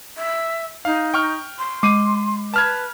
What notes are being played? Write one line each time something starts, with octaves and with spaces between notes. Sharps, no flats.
E5
D#4 F5
G5 C#6 F6
C6
G#3 D6 C7 D#7
B4 A5 F6 G#6